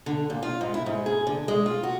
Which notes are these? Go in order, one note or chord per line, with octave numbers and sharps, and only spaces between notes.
D3
A#2
F4
G#2
E4
G#2
G#4
D3
G#3
F4
F#4